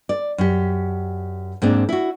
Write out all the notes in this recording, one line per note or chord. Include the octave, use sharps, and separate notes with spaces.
D5
F#2 G4
G#2 A#3 C4 D4
E4 F#4